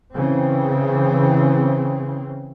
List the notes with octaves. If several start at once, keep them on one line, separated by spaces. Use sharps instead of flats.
C#3 E3 C4